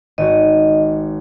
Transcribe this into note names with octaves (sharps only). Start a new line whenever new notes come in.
G#1 F#4 D#5